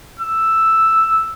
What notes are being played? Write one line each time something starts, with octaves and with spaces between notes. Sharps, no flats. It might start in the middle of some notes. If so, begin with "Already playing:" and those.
E6